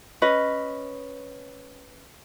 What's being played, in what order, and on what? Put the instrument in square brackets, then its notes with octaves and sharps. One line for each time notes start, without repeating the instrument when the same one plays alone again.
[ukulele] C#4 B4 D#5